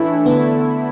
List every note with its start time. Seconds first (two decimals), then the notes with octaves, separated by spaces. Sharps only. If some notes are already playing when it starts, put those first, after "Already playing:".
Already playing: A2 E3 A3 D4 E4
0.25 D3 A3 B3 E4